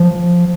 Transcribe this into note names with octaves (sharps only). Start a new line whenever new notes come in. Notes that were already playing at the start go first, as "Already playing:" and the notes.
Already playing: F3